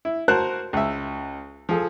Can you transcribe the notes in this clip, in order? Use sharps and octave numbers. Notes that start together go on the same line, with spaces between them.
E4
F#4 A#4 C5 A5 F#6
C#2 E5
F3 G#4 A4